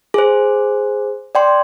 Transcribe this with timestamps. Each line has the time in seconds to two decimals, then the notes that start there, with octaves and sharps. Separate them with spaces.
0.14 G#4 C5
1.35 D5 G5 C6